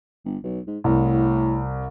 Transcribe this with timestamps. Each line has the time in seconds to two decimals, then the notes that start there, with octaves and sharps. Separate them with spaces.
0.25 G1
0.43 B1
0.67 G#2
0.84 C2 A2